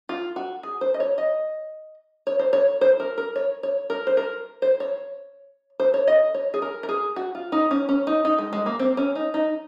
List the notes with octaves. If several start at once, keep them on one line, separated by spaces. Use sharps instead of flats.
F4
F#4
G#4
C5
D#5
C#5
D#5
C#5
C5
C#5
C5
A#4
A#4
C#5
C#5
A#4
C5
A#4
C5
C#5
C5
C#5
D#5
C#5
G#4
A#4
A#4
G#4
F#4
F4
D#4
C#4
C#4
D#4
D#4
G#3
G#3
A#3
C4
C#4
D#4
D#4